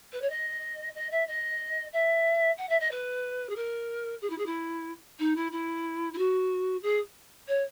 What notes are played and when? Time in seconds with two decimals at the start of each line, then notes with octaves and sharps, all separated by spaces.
0.12 B4
0.21 C#5
0.29 D#5
0.94 D#5
1.11 E5
1.27 D#5
1.92 E5
2.57 F#5
2.69 E5
2.80 D#5
2.91 B4
3.49 G#4
3.55 A#4
4.21 G#4
4.29 E4
4.38 G#4
4.46 E4
5.19 D#4
5.36 E4
5.51 E4
6.13 E4
6.17 F#4
6.82 G#4
7.47 C#5